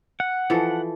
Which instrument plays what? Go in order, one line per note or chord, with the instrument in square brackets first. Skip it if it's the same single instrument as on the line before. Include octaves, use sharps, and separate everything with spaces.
[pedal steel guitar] F#5
[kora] E3 F3 A4